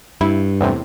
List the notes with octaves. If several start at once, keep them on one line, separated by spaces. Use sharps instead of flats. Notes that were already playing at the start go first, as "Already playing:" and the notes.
G2 E4
E2 A2 C3